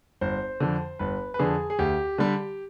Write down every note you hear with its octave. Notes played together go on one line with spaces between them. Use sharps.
G1 C5
F2 D3
G1 B4
B4
F2 D3 G#4
G#4
D2 G4
D3 G3